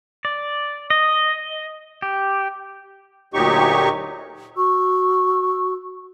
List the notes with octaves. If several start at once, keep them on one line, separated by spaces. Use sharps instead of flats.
D5
D#5
G4
D2 A#2 F#3 D#4 G4 C#6
F#4 C#6 E6